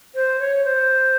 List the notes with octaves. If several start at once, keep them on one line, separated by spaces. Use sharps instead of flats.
C5
C#5
C5